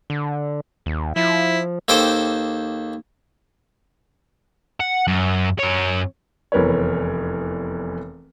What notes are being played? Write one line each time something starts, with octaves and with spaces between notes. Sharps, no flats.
D3
D#2
F3 E4
D#2 A4 C5 G5 D6
F#5
F#2
F#2 C#5
F1 E2 A#4 B4 C#5